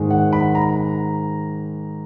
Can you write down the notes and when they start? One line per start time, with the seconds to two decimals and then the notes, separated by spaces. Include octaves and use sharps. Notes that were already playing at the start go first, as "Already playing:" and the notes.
Already playing: G#2 D#3 G#3
0.11 F#5
0.33 B5
0.55 A#5